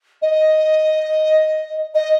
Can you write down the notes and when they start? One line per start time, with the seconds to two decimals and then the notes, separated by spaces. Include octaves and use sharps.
0.22 D#5
1.94 D#5